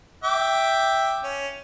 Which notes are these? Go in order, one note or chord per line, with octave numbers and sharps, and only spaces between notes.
E5 G5 D6
C#4